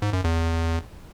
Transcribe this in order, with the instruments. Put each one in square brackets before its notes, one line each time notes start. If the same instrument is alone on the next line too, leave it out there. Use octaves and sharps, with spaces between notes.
[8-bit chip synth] G#2
F#2
E2